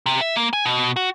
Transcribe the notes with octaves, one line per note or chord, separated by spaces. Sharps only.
C3
E5
A#3
G#5
B2
F#4